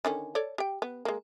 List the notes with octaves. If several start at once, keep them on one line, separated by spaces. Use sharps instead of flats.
D3 D#3 C#4
A4 C#5 D5
G4 G5
B3
G#3 A#3